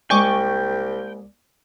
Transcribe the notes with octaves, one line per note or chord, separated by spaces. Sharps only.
C2 G#3 A#3 D5 G5 G#5 C#6 D6